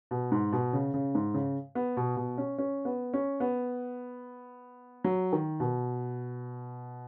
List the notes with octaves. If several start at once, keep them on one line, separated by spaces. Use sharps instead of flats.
B2
G#2
B2
C#3
C#3
G#2
C#3
B3
B2
B2
C#4
C#4
B3
C#4
B3
F#3
D#3
B2